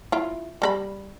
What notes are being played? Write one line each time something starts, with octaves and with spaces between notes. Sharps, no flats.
E4 F4
G3 A4 B5